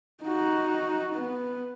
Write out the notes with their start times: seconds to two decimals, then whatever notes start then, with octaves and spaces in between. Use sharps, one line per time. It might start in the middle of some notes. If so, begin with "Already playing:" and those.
0.24 D#4 F#4
1.14 B3